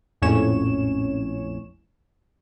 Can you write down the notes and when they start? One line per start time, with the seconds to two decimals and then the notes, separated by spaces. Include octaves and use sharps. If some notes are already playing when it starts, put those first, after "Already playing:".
0.22 A#1 F2 A2 C#4 C#5 E7